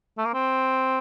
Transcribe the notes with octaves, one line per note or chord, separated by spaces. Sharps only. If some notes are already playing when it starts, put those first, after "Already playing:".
A3
A#3
C4